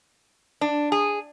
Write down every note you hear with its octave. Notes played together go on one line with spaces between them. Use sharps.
D4
G#4